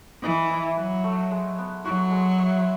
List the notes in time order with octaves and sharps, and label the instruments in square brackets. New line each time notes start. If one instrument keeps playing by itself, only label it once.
[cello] E3 [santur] D#5
[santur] E4
[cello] F#3 [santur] B4
[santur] A3
G#3
B3
[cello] F#3 [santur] F#4
[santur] G#3
E5